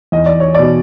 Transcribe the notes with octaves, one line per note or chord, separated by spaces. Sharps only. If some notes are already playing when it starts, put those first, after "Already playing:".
E2 D#5
D5
C#5
B2 D5